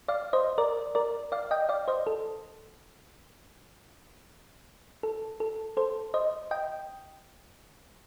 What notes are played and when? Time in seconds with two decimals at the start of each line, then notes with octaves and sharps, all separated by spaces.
0.08 D5 F5
0.33 C5 D#5
0.58 A#4 D5
0.95 A#4 D5
1.32 D5 F5
1.51 D#5 G5
1.69 D5 F5
1.88 C5 D#5
2.07 A4
5.03 A4
5.40 A4
5.77 A4 C5
6.14 C5 D#5
6.51 D#5 G5